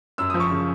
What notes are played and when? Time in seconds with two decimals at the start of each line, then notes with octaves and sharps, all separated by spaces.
0.18 F#2 E6
0.30 D#6
0.34 F3
0.40 C#6
0.51 C#3